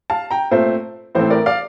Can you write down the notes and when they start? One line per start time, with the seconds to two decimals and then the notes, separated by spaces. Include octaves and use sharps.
0.10 F5 A5
0.31 G5 A#5
0.51 A#2 A3 C4 C5
1.15 A2 E3 A3 C4 C5
1.30 A#4 D5
1.46 D5 F5